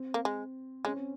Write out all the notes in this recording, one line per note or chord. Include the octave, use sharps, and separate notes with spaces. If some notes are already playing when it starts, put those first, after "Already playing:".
Already playing: C4
A#3
G#3
G#3 C#4
C4